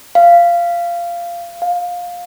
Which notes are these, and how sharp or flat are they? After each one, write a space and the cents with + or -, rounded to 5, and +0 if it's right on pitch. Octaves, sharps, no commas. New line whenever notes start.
F5 -15
F5 +20